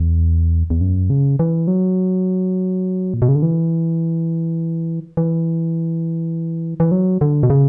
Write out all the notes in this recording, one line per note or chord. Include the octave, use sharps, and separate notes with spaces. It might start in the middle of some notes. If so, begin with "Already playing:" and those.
Already playing: E2
E2
F#2
C#3
E3
F#3
A#2
B2
C#3
D3
E3
E3
E3
F#3
D3
B2
C#3